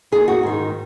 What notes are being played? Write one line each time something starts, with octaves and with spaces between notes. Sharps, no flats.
D#2 D#3 G#4
F#4
G#2 D#3